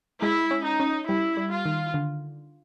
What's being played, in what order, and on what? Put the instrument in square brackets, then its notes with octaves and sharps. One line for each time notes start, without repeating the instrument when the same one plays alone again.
[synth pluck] G#3 [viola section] E4
[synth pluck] C#4
[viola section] D#4
[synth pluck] C#4
[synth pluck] G3 [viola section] E4
[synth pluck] G3
[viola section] F4
[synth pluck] D#3
D3